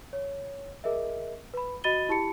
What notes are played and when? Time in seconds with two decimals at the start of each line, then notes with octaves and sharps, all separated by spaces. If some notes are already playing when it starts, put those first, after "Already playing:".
0.13 C#5
0.84 G#4 A#4 D#5 E5
1.54 B4 B5
1.84 F#4 D#5 B5 A6 D#7 G7
2.09 E4 G4 A5 B5 C#7